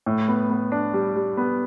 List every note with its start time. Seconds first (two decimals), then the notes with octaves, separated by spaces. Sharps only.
0.06 A2
0.28 B3
0.50 B3
0.72 D4
0.94 G3
1.16 G3
1.37 B3